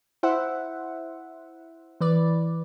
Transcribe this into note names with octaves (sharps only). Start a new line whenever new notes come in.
E4 C5 E5 F#5
E3 B4 D5